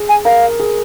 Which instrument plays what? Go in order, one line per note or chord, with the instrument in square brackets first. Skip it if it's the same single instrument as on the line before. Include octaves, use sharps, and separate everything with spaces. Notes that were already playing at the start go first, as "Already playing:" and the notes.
Already playing: [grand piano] G#4
[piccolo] G#5
[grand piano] A#4 [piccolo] F5
[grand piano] G#4